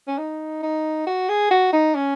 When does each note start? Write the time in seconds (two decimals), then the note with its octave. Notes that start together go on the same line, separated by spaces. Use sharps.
0.08 C#4
0.18 D#4
0.63 D#4
1.07 F#4
1.29 G#4
1.51 F#4
1.73 D#4
1.95 C#4